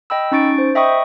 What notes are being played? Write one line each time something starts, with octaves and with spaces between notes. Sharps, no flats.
D#5 G5 B5 E6
C#4 D#4 C#6 A6 D7
C5
D#5 E5 G5 B5 C#6 D#6